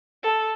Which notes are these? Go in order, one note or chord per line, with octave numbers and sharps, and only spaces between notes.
A4